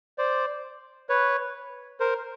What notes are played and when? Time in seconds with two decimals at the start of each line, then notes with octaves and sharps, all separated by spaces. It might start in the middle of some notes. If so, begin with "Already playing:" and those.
0.18 C5 D5
1.09 B4 C#5
2.00 A#4 C5